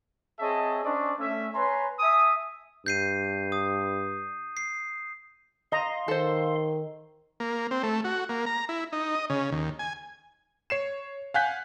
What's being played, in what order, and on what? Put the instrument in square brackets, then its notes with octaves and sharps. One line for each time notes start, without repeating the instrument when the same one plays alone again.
[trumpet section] C4 G#4 C#5 D#5 E5 A5
C#4 D4 C5 D5 D#5 C#6
A3 C#4 E5
B4 C#5 G#5 A#5 C6
E5 G#5 A5 D#6
[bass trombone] G2 [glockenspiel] G6 C7 D#7
[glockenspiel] D#6
C7
[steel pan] D#5 A#5 [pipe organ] F5 C6
[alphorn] D#3 [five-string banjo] A4 C5
[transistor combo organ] A#3
C4
A3
F#4
A#3
A#5
E4
D#4
D#5
C#3
D#2
G#5
[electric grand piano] C#5 C7 E7
F5 F#5 G#5 F#6 G6 B6